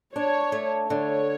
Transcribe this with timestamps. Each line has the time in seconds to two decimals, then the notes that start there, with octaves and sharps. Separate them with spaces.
0.15 D4 C#5
0.52 A3
0.90 D3 C#5